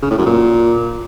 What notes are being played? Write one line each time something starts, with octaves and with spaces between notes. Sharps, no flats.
C#3
A2
F#2
A#2